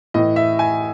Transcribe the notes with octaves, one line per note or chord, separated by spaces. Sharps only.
A2 E3 D#5
E5
G#5